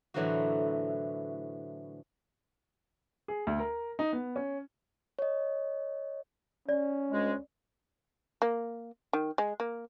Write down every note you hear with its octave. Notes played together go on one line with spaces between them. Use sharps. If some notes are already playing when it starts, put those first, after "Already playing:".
A2 D3 E3 F#3 C4 F#4
G#4
D2
A#4
D#4
B3
C#4
C#5 D#5
C#4 D5
D2 G#3
A#3
D#3
G#3
A#3